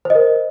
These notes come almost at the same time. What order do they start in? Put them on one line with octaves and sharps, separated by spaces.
C5 D#5 A#4